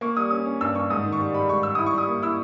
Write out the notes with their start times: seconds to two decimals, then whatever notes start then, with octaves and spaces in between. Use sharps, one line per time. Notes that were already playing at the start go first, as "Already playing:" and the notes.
0.01 A#3 C#6
0.17 G3 D#6
0.31 C#4 D#6
0.46 C#4
0.61 G2 E6
0.75 G2 C#6
0.90 G#2 D#6
1.05 D#3
1.12 C#6
1.19 G3
1.34 G3 B5
1.49 G#2 C#6
1.63 G3 E6
1.75 E4 D#6
1.86 C#6
1.93 G3 D#6
2.08 A#3
2.22 E4 E6